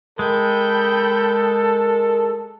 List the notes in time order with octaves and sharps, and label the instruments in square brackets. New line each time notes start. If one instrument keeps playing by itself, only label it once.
[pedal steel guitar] G#3 [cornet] A4 [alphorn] A#4 [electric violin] G5 B5